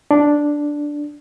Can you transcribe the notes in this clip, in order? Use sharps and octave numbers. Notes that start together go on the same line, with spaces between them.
D4